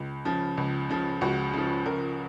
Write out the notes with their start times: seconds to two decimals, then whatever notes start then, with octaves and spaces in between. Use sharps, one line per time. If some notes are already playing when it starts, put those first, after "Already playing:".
Already playing: C#2
0.25 C#3 F3
0.57 C#2
0.89 C#3 F3
1.21 C#2 F#4
1.53 C#3 F3
1.86 C#2 A#4